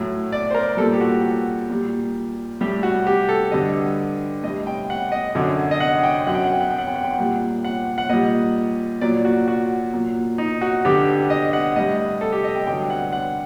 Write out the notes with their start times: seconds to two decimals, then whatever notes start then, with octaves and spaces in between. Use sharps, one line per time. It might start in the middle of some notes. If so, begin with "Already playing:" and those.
Already playing: A2 F#3
0.32 D5
0.51 C5
0.55 A#4
0.77 A#2 G3 A4
0.94 G4
1.01 F#4
1.23 F#4
1.69 A#2 G3
2.61 A2 G3 G4
2.83 F#4
3.07 G4
3.29 A4
3.52 G2 D3 G3 D#5
4.43 A2 D#5
4.48 G3
4.67 G5
4.90 F#5
5.12 D#5
5.35 F#2 D3 F#3
5.71 D#5
5.80 F#5
6.03 G5
6.27 F#2 F#3 F#5
6.35 G5
6.44 F#5
6.53 G5
6.61 F#5
6.70 G5
6.78 F#5
6.87 G5
6.96 F#5
7.04 G5
7.13 F#5
7.18 A#2 G3
7.64 F#5
7.98 F#5
8.09 A#2 G3 D#5
9.01 A#2 F#3 D5
9.25 F#4
9.48 F#4
9.93 A#2 F#3
10.38 D#4
10.61 F#4
10.85 G2 D3 G3 G4
11.30 D#5
11.53 F#5
11.76 A2 G3 D#5
12.21 A4
12.32 G4
12.44 D#5
12.56 G5
12.67 G2 D3 F#3 G5
12.90 F#5
13.13 F#5